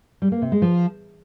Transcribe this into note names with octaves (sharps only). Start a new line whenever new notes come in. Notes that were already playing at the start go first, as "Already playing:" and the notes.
G3
A#3
C3
G#3
F3